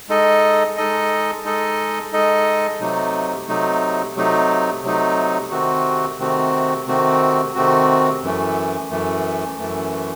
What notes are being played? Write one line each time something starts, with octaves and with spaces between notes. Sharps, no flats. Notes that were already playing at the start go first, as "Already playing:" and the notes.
G#3 D#4 A4 D#5
G#3 D#4 A4 D#5
G#3 D#4 A4 D#5
G#3 D#4 A4 D#5
C3 F#3 A3 D#4
C3 F#3 A3 D#4
C3 F#3 A3 D#4
C3 F#3 A3 D#4
C3 D#3 A3 C4 F#4
C3 D#3 A3 C4 F#4
C3 D#3 A3 C4 F#4
C3 D#3 A3 C4 F#4
F#2 E3 A3
F#2 E3 A3
F#2 E3 A3